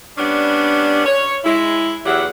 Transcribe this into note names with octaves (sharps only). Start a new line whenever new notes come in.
G3 B3 C#4 D4
C#5
G#3 E4
E2 F#3 E4 G4 F#5